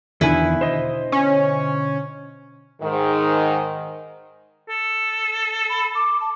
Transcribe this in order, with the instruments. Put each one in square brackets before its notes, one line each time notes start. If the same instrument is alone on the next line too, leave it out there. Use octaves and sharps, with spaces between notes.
[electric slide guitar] E2 D#3 G#5 [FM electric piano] B2 D3 [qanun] E4 B4
[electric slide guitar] C5 D#5
[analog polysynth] C#4
[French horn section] G#2 D#3
[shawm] A4
[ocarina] B5
D6
A5